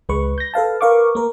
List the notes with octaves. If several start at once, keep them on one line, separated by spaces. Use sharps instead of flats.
C#2 G#3 B4 C#6
G6 A#6
A4 B4 F5 A5
A#4 B4 F5 C#6 D6
A#3 A#4